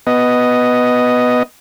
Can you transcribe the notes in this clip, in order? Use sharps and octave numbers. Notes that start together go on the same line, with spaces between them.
B3 D#5